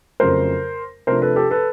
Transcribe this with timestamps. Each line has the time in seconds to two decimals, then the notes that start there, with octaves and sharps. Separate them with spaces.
0.20 F2 C#3 F#3 A3 A#4 C5
1.07 C3 F3 A3 D4 A#4 C5
1.22 A4 B4
1.36 G4 A4
1.51 A4 B4